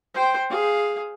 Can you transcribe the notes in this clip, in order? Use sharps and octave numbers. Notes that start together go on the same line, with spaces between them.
C5 G5
G#4 F5